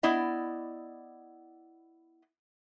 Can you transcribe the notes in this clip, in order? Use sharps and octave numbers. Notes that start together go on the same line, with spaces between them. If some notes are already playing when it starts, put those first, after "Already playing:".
B3 E4 D5 D#5